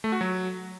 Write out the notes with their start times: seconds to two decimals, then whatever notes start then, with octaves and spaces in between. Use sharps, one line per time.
0.04 A3
0.12 F#4
0.21 F#3